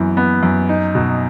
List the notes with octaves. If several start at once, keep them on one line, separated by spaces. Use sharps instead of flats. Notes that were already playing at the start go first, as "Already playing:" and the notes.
Already playing: F#2 E3 B3
B3
F#2
D#4
B2